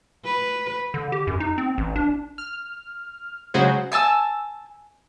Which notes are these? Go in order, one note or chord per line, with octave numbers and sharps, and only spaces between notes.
B4
D3
G4
F#2
D#4
C4
A1
D4
F6
C#3 F#3 G#3 F#4 G#4 C5
E5 G#5 A5 E6